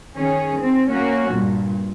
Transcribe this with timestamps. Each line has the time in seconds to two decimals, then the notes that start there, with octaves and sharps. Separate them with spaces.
0.15 D#3 C#4 G#4
0.60 C4
0.90 A#3 C#4 F#4
1.33 G2 A#2